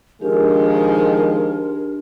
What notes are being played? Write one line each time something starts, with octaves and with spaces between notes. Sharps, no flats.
D#3 F3 G#3 D4 G4 A#4